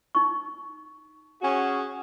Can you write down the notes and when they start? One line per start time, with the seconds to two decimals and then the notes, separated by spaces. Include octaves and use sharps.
0.15 D#4 C#6
1.42 C#4 F#4 G#4